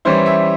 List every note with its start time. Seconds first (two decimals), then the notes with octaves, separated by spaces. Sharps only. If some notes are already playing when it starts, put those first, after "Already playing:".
0.05 E3 G3 C#4 E4 C5
0.26 E5